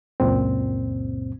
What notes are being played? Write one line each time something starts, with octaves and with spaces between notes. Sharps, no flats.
C#2 F#2 A#2 C4